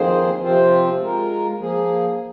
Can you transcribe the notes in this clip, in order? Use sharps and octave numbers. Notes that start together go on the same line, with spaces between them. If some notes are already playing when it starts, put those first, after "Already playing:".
Already playing: F2 D#3 A#3 G#4 C5
C3 F3 C4 F4 C5
G#3 F4 A#4
F3 A#3 G#4